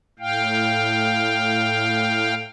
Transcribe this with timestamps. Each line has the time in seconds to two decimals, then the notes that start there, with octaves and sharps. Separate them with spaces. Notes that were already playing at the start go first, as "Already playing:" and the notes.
0.19 A2 F5 G5